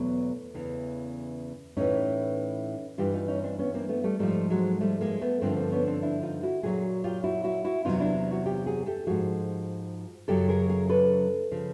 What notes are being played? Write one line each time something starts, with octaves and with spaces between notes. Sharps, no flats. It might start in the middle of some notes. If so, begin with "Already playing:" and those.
Already playing: E2 B2 F#3 A3
E2 C#3 E3
A2 E3 C#4 D#4
G2 E3 F4 G4
D#4 F4
C#4 D#4
C4 D4
B3 C#4
A#3 C4
A3 B3
G3 A3
G#2 F3 G3 A3
F#3 G#3
G3 A3
G#3 A#3
A3 B3
G2 D3 F3 A#3 C4
A#3 C4
B3 C#4
C4 D4
D4 E4
D#4 F4
E4 F#4
A#2 F#3 F#4 G#4
F4 G4
E4 F#4
E4 F#4
E4 F#4
E2 C3 D#3 F#3 D#4 F4
D4 E4
E4 F#4
F4 G4
F#4 G#4
G4 A4
G#2 F3 F#4 G#4
F#2 C#3 F#3 G4 A4
G#4 A#4
G#4 A#4
A4 B4
C#3 F3